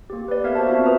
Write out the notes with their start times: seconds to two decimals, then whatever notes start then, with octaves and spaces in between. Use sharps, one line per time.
0.10 A#3 G4
0.28 B4 D5
0.44 B3 A#4 E5 F5 F6 G#6
0.55 F#4 C5 A5
0.69 C4 F4 F#4 E5
0.83 A#4 B4 E5 A#5 D#6